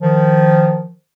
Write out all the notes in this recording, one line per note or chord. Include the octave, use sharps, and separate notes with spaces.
D#3 F3